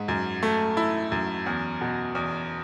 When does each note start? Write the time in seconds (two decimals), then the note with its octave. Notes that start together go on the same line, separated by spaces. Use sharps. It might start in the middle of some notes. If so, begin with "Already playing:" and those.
Already playing: G#2
0.08 F#2
0.43 A3
0.77 E4
1.12 F#2
1.46 E2
1.81 B2
2.15 E2